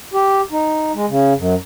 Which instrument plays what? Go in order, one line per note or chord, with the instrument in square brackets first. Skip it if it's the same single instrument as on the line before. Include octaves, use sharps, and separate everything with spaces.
[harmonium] G4
D#4
G#3
C#3
F#2